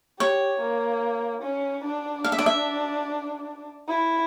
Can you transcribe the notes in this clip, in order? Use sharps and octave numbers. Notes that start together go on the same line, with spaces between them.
G4 C#5
A#3
C#4
D4
F5
E5
D5
E5
E4